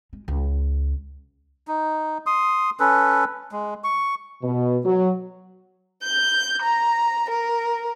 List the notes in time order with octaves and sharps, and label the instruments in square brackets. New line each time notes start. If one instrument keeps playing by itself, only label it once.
[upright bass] G#3
C#2
[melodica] D#4
C6 D#6
C#4 A4 B4
G#3
C#6
[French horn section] B2
F#3
[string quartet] G6
A#5
A#4